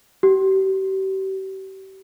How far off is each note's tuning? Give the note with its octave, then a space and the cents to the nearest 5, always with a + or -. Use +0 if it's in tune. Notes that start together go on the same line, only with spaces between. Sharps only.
G4 -40